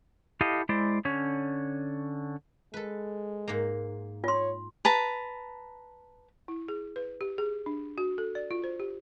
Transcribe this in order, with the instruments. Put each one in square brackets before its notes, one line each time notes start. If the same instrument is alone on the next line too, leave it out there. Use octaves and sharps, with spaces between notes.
[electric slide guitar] E4 G4 A4 D#5 F5
G#3 E4 C5 D5
D3 C#4 C#5
[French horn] G#3 [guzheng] A4 B4
[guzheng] G#2 A#3
[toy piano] F4 C6 [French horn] C#5
[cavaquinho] B4 A5 A#5
[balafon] E4
G#4
B4
G4
G#4
D4
F#4
A4
D5
F4
C5
G4